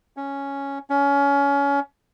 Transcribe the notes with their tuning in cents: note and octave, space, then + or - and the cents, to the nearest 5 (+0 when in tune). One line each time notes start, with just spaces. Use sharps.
C#4 +0
C#4 +25